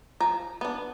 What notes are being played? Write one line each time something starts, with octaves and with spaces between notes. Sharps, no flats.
F3 A#5
B3 D4